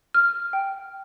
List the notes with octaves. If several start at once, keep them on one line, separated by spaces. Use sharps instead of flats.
F6
G5